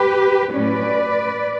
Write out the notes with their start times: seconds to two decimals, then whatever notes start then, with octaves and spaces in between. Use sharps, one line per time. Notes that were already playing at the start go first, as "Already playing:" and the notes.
Already playing: G4 B4
0.53 A2 F#3 C#4 B4 D5